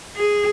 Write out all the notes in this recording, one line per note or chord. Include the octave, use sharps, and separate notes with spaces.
G#4